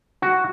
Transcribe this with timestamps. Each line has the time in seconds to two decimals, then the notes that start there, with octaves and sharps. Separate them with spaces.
0.22 F#4